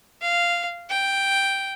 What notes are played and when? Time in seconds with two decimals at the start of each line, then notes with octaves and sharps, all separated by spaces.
0.22 F5
0.90 G5